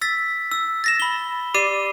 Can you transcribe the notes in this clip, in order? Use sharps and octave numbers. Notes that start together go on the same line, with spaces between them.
E6 A6 B6
E6
A6 A#6 E7
B5 G7
G4 D5 D6 C7 D#7